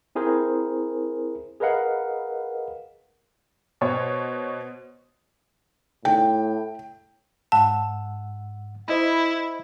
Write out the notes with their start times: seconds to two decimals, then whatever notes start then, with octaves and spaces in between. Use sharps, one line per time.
0.15 C4 E4 G#4 A#4 C5
1.60 G#4 A#4 B4 D#5 F5 F#5
3.81 B2 C5 C#5
6.05 A2 G5
7.52 G#2 F#5 A5 E6
8.88 E4 C5 D#5 B5